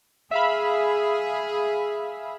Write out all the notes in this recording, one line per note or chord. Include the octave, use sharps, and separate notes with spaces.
G#4 E5 F5 B5